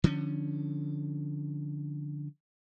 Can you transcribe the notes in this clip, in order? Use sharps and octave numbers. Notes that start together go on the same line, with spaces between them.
D3 F3 C#4